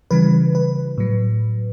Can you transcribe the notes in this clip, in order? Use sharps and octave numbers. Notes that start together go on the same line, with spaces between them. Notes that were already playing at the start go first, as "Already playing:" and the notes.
C#3 E3 G3 B4
B4
A2 F#3